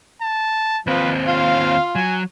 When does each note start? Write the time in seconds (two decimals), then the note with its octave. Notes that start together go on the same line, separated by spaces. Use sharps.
0.22 A5
0.87 D#2 F3 C4 B4
1.27 F4 F5
1.95 F#3 G#5